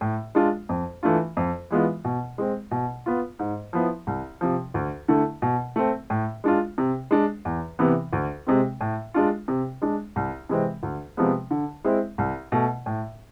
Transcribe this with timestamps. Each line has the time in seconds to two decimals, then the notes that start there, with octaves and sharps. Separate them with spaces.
0.01 A2
0.35 G#3 D4 F4
0.69 F2
1.03 E3 A3 D4 F4
1.37 F2
1.71 E3 G#3 B3 F4
2.04 B2
2.38 G#3 C4
2.71 B2
3.06 B3 F4
3.39 G#2
3.73 F3 B3 E4
4.07 C2
4.41 C3 F3
4.74 D2
5.08 D3 A3 E4
5.42 B2
5.76 A3 C4
6.10 A2
6.44 G#3 D4 F4
6.78 C3
7.11 G#3 D4
7.45 E2
7.79 C3 E3 B3
8.13 D2
8.47 C3 G#3 C4
8.81 A2
9.14 G#3 D4 F4
9.48 C3
9.82 G#3 D4
10.16 C2
10.49 C3 E3 G#3 C4
10.83 D2
11.17 C3 F3 G#3 B3
11.51 D3
11.85 G#3 C4 E4
12.18 C2
12.52 B2 A3
12.86 A2